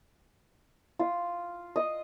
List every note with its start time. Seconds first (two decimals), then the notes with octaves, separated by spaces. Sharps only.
0.99 F4
1.76 D#5